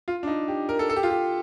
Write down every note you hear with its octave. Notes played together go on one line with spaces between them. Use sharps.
F4
D4
D#4
G4
A#4
A4
A4
G4
F4
G4